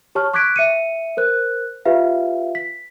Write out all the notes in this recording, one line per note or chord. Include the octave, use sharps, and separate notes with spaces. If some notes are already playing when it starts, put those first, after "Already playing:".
G4 C#5 A5 C#6 F6
C#6 D6 F#6 G#6 B6 D7
E5 C#7 D#7
A#4 C5 F#6
F4 G4 B4 E5 F5
B6